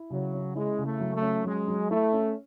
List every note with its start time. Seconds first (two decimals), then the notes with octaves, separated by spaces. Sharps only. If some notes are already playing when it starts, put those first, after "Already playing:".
Already playing: E4
0.10 C#3 F#3
0.33 C#4
0.55 G#3 E4
0.78 C#3
0.85 A3
1.00 F#3
1.15 A3
1.22 C#4
1.45 F#3 G#3
1.68 F#3
1.90 A3 E4
2.13 C#4